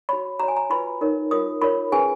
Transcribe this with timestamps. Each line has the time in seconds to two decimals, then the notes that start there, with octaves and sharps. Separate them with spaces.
0.09 F#4 C#5 B5
0.40 F#4 C#5 A#5
0.48 G#5
0.57 A#5
0.70 F4 B4 B5
1.01 D#4 A#4 C#5
1.31 F4 A#4 C#5 D#6
1.62 F4 A#4 C#5 B5
1.92 C#4 G#4 B4 G#5